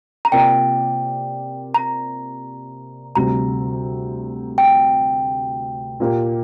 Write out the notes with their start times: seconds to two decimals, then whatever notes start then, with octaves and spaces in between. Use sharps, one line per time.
0.25 A#5
0.32 C3 A#3 F4 A#4 D5 G5
1.74 A#5
3.15 D2 C3 G3 A#5
4.58 G5
6.00 A#2 A#3 G4